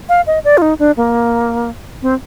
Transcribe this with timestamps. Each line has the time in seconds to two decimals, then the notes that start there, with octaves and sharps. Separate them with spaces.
0.09 F5
0.27 D#5
0.44 D5
0.58 F4
0.62 D#4
0.79 D4
0.97 A#3
2.02 C4